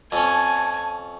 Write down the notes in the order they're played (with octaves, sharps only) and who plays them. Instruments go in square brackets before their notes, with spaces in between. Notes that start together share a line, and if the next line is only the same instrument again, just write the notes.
[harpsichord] F2 C#4 [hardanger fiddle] G#5 [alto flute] A5